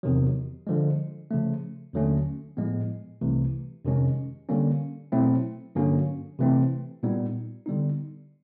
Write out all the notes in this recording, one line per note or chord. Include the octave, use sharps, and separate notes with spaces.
E2 C3 D#3 F#3
D3 F3 G#3
C#3 F3 A3
D#2 D3 F#3 A3 C#4
A2 F3 G#3 B3
C2 C3 E3 A3
F2 C3 D#3 G#3 C#4
D3 G3 A#3 C#4
B2 F#3 A3 C4 E4
G2 D3 F#3 A#3 C#4
C3 E3 A3 C4
A#2 G3 B3 D#4
D3 G3 B3 D#4